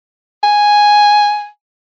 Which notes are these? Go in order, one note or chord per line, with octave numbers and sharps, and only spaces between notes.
G#5